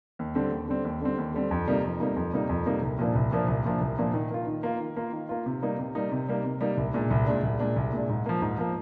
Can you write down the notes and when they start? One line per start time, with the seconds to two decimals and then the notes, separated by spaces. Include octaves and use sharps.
0.19 D#2
0.35 D3 G3 C4
0.52 D#2
0.68 D3 G3 C4
0.85 D#2
1.01 D3 G3 C4
1.18 D#2
1.34 D3 G3 C4
1.51 F2
1.67 C3 G3 A#3 D#4
1.84 F2
2.00 C3 G3 A#3 D#4
2.16 F2
2.33 C3 G3 A#3 D#4
2.49 F2
2.66 C3 G3 A#3 D#4
2.82 C2
2.99 A#2 F3 A#3 D4
3.15 C2
3.32 A#2 F3 A#3 D4
3.48 C2
3.65 A#2 F3 A#3 D4
3.81 C2
3.98 A#2 F3 A#3 D4
4.14 D#3
4.30 A#3 F4
4.47 D#3
4.63 A#3 F4
4.80 D#3
4.97 A#3 F4
5.13 D#3
5.29 A#3 F4
5.46 C3
5.62 G3 A#3 D#4
5.79 C3
5.95 G3 A#3 D#4
6.12 C3
6.28 G3 A#3 D#4
6.44 C3
6.61 G3 A#3 D#4
6.77 C2
6.94 A#2 G#3 D4
7.11 C2
7.27 A#2 G#3 D4
7.43 C2
7.59 A#2 G#3 D4
7.76 C2
7.93 A#2 G#3 D4
8.09 G#2
8.26 F3 A#3
8.42 G#2
8.58 F3 A#3